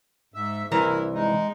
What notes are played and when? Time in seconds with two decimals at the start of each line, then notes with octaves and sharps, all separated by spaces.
0.34 G#2 E5
0.72 C2 E3 E4 A#4 A#5
1.14 G#3 D#4